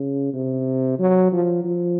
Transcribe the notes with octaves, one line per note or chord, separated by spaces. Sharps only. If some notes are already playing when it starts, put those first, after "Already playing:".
Already playing: C#3
C3
F#3
F3
F3